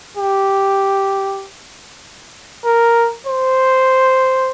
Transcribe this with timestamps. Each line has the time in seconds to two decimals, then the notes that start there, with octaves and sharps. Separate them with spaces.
0.17 G4
2.65 A#4
3.27 C5